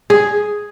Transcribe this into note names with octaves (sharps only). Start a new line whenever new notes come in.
G#4